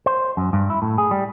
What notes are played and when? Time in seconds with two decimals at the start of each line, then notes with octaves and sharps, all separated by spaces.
0.06 C5
0.37 F#2
0.53 G2
0.70 E4
0.82 A2
0.98 G#4
1.11 G3